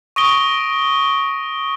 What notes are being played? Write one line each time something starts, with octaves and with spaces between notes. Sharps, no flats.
C#6 D#6 A#6 D7 G7